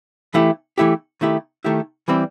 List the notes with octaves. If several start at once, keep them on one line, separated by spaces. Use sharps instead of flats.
E3 A3 E4 G4
E3 A3 E4 G4
D#3 A3 E4 G4
D#3 A3 E4 G4
E3 G3 C4 E4